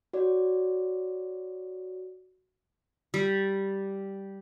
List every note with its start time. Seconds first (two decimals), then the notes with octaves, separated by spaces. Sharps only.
0.13 F#4 C#5 D5
3.14 G3